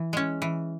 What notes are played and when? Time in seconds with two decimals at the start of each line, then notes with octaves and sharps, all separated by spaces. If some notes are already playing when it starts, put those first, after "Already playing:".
Already playing: E3
0.13 G#3 C#4
0.42 E3